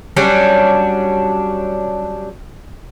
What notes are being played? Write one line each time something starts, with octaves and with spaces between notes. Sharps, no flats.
F#3 G3 C#4 D4